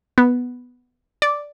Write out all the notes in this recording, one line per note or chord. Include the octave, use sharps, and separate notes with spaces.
B3
D5